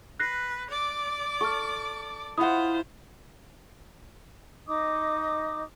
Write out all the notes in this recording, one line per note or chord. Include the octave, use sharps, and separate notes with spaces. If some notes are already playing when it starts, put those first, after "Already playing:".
B4 F#6 A#6 C7
D5 D6
A4 C#6 F6
E4 F4 C5 F#5 D#6
D#4 D#5 D6 D#6